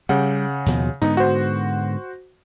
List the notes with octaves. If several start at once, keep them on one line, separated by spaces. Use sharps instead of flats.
C#3 G3 F#5
D#2 B2 F3
G#2 D3 B3 D#4
F#4 C5